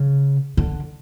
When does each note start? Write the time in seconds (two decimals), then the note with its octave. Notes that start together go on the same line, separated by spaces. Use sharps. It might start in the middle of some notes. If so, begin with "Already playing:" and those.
Already playing: C#3
0.57 D3